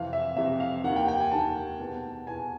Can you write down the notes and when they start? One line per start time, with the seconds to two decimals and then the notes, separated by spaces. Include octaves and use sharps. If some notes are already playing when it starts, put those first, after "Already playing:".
Already playing: F2 C3 E3 F5
0.13 E5
0.36 F2 C3 E3 E5
0.60 F5
0.84 D#2 D#3 F#5
0.96 G5
1.08 G5
1.20 G#5
1.31 D#2 D#3 A5
1.80 E2 B2
2.27 E2 B2 G#5